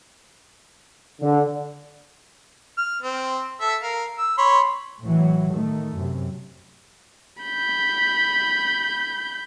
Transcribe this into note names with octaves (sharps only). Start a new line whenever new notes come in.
D3
F6
C4
A4 E5
A#4 F5
E6
C#5 B5 C6
A2 E3 F#3
D#3 A3
F#2 C3
B5 G6